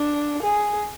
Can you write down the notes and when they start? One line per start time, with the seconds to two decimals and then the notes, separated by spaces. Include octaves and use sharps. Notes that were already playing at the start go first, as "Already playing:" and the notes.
Already playing: D4
0.42 G#4